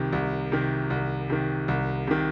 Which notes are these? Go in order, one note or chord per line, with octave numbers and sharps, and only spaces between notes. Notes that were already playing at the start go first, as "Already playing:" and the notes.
Already playing: C2 C3 D#3
C2
C3 D#3
C2
C3 D#3
C2
C3 D#3